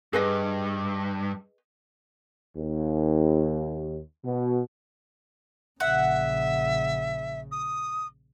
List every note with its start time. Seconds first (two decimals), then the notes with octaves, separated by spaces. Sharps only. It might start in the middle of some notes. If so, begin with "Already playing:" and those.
0.13 G2 G#4 B4 D#5
2.56 D#2
4.23 B2
5.80 A#1 C#3 E5 F#5
7.51 D#6